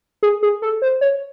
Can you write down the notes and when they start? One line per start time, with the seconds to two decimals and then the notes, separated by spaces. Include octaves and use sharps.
0.23 G#4
0.43 G#4
0.62 A4
0.82 C5
1.01 C#5